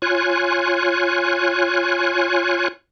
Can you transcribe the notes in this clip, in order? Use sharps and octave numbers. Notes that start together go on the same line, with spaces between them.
F4 C#5 G#5 F#6